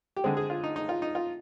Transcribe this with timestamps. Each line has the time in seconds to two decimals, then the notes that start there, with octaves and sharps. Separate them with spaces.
0.17 G4
0.24 D3 G#3 C4 G#4
0.37 G#4
0.50 F4
0.64 D#4
0.76 D#4
0.89 F4
1.02 D#4
1.15 F4